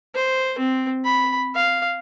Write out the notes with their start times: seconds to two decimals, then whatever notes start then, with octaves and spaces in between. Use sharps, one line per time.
0.15 C5
0.59 C4
1.05 B5
1.55 F5